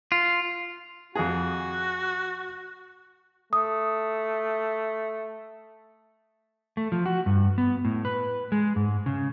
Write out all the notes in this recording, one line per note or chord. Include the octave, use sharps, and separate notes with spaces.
F4
F2 F#4 G#4
A3 D#6
A3
F3
F#4
G2
B3
A2
B4
G#3
G#2
C#3